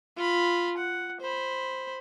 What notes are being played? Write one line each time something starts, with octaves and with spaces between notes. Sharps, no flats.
F4 B5
F#5
C5 B5